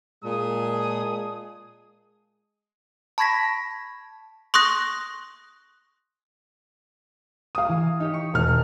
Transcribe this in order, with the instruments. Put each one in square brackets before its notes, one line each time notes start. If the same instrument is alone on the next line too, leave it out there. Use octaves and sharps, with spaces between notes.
[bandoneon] A#2 [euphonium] G#3 [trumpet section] G#4 A5 D#6
[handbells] A5 B5 C#6 G#6 A#6 B6
[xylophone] C6 C#6 D#6 F#6 A#6
[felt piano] F5 D#6
[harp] E3
D#4 G4 C#5
C#6
[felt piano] E1 F6 [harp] D#2